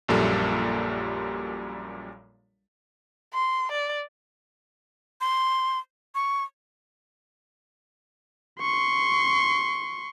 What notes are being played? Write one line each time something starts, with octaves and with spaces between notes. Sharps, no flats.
A#1 F#2 A#2 G3 A4
C6
D5
C6
C#6
C6 C#6